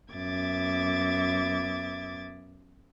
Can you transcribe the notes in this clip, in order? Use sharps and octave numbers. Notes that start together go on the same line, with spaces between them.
F#2 B3 E5 D6 G#6 A6